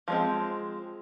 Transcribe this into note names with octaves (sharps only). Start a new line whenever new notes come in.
F3 G#3 C4